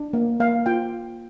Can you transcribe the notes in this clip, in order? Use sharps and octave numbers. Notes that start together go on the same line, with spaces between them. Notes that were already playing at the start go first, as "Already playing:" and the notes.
Already playing: D4
A#3
A#3 F5
F4 G5